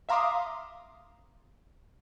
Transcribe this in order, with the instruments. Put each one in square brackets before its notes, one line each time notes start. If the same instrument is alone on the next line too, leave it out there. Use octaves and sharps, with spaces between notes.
[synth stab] E5 F5 A#5 C6 D6 D#6